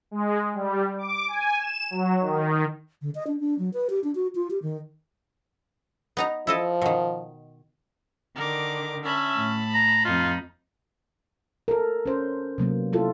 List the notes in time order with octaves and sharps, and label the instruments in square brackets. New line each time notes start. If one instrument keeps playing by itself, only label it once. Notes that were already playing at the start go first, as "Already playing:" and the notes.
[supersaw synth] G#3
G3
D6
G#5
E7
F#3
D#3
[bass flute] D3
D#5
D4
D4
F#3
B4
G4
D4
F#4
F4
G4
D#3
[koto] B3 D#4 A#5
[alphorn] F3 [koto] E4 A4 D#5
[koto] B2 D#3
[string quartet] D3 D#3 [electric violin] A#4 D6
[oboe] C#4 [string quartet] E5 [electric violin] A5 B5
[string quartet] A2
[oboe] A#5
[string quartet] F2 D#4 [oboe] F4
[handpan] A4 A#4
C#4 C5
C3 F#3 A#3 B3
E4 F4 A4